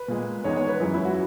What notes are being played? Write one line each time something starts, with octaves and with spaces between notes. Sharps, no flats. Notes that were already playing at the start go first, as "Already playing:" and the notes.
Already playing: B4
A#2 G#3
E2 D#3 G#3 C#5
C#5
B4
F#2 E3 G#3
E4
F#4